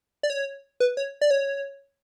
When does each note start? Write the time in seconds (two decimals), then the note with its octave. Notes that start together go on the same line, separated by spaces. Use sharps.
0.23 D5
0.30 C#5
0.80 B4
0.97 C#5
1.21 D5
1.31 C#5